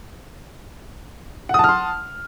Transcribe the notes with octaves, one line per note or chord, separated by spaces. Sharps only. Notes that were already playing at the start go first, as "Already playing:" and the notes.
F#5 A5 C6 D#6 F6